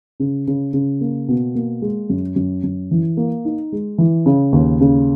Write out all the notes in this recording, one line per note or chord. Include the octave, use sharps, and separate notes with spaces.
C#3
C#3
C#3
A#3
B2
A#3
G#3
F#2
F#2
F#2
E3
A#3
D#4
G#3
E3
C#3
D#2
C#3